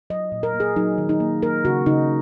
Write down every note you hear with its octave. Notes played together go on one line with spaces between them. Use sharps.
F#3 D#5
A#2
A#4
A#3
G#4
F#3 D#4
D#3
D#4
A#3
A#3 A#4
C#3 F#4
C#3 D#4